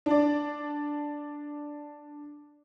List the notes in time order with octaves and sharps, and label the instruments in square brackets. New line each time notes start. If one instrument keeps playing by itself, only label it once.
[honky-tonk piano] D4 D5